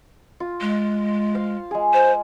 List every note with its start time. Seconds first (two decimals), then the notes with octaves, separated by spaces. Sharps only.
0.40 F4
0.61 G#3
1.34 C5 F5
1.71 G#3 G#4
1.94 C5